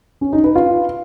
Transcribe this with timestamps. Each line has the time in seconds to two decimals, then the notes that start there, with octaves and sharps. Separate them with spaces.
0.21 C#4
0.33 D#4
0.44 B4
0.56 F4